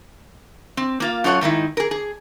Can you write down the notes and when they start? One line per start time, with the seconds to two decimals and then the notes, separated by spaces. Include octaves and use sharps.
0.77 C4
1.00 A#3 F4 F5
1.24 F#2 F4 A4 C#5 F#5
1.41 G#2 D#3 D#4 E4
1.77 G#4 A#4
1.91 G#4